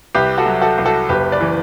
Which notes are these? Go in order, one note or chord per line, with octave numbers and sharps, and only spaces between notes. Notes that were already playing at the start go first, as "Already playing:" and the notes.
C2 G4 B4
F#4 A4
F#3
F#4 A4
C2
F#4 A4
F#1 G4 B4
B4 D5
E3